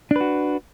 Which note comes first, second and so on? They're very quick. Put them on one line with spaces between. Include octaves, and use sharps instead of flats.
D4 B4 F#4